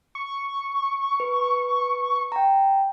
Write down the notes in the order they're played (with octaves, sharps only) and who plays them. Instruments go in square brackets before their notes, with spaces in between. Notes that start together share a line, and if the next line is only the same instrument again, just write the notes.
[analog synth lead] C#6
[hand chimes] B4
G5 A#5